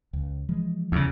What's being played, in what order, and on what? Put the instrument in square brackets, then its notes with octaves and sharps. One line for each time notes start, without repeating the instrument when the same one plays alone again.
[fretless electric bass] C#2
E3 F3 G#3
[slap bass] E2 C#3